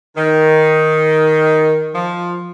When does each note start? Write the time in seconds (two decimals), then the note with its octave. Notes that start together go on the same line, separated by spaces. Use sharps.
0.17 D#3
1.95 F3